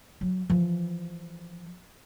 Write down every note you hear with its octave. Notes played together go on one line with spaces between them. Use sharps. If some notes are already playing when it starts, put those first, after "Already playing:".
F#3
E3 F3